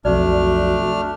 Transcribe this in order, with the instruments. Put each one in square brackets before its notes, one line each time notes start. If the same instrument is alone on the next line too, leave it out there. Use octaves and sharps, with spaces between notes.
[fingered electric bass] B1 F2 [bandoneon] A3 D4 F6 [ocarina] F#4 [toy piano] D5